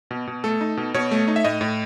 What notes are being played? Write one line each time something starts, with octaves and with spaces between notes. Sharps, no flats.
B2
B2
A3 A4
D#4
B2
B2 C#5
A3
D#4
E5
A2 D#5
A2